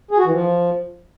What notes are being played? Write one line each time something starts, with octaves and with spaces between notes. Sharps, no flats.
G#4
F#4
E3
F3